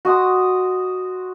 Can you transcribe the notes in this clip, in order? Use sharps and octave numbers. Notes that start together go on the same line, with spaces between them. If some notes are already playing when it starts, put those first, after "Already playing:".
F#4 D#5 C6 D#6